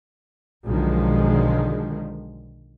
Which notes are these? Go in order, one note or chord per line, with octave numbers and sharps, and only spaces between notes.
B1 D3 D#3 F3 G#3